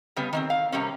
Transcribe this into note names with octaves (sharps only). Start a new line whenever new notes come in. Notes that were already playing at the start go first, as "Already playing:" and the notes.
C#3 G3 B3
D#3 A#3 C4
F5
C3 G3 A#3 C#4